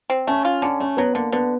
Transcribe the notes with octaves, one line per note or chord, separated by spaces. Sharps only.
C4
A3 C#4
F4
D3 C#4
A3 C#4
F#3 B3
D3 A#3
D3 B3